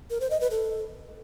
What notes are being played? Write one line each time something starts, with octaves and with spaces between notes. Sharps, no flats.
A#4
C5
D#5
B4
A4